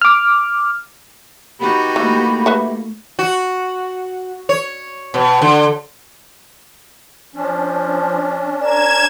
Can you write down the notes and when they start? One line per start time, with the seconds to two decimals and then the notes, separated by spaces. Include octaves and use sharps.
0.01 D6 F6
1.59 B3 D#4 F#4 G4 B5
1.96 E3 A3 A#3
2.46 B4 E5 F#5
3.19 F#4
4.49 C#5
5.14 B2
5.42 D3
7.35 F3 C#4 D4
8.62 A#4 D5 G#6 E7